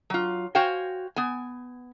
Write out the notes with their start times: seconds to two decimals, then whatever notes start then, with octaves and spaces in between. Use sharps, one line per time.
0.10 F#3 F4
0.55 F#4 C5 F5 G5 G#5
1.16 B3 G#5